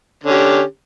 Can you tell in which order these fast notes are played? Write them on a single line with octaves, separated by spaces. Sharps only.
D3 C#4 G4